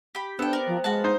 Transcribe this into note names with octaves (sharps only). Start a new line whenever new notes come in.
G4 B5
C3 B3 D4 A4 G5
A#4 D5
F3
B2 F3 G#3 F#4 F5 F#5 A5
D#4 C5